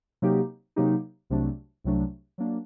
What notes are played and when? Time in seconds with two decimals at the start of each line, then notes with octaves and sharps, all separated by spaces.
0.22 C3 F#3 A#3 D#4 G4
0.76 C3 F#3 A#3 D#4 G4
1.30 C2 C3 F#3 A3 D4
1.84 C2 C3 F#3 A3 D4
2.38 F#3 A#3 D4